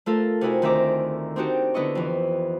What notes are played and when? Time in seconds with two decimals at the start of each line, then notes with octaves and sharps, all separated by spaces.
0.06 A3 F4 A4 A#4
0.41 C3 D#4 E4 F#4 G#5
0.62 D2 D#3 C4 E5 A#5 D6
1.36 C4 D4 D#4 F#4 G4
1.74 D3 B3 E4 D#5 C#6
1.95 F2 E3